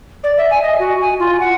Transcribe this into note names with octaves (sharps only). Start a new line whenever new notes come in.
D5
E5
G#5
D#5
F#4
G#5
F4
F#5